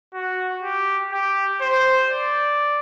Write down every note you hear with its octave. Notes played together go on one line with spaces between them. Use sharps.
F#4
G4
G4
C5
D5